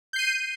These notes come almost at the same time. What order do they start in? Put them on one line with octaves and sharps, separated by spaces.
G6 C7 D#7